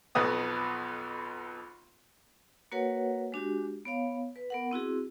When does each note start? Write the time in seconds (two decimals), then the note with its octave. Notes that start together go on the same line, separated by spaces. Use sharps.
0.15 B1 F2 B3 D#6
2.72 A#3 F#4 A#4 B4 C#5 F#5
3.32 G#3 D4 F#4 G4
3.85 B3 C#5 F5
4.36 B4
4.50 B3 A#4 F#5
4.71 C4 E4 F#4 G#4